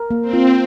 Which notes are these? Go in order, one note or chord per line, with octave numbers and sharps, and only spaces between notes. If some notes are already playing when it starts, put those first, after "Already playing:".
Already playing: A#4
A#3
C4
F4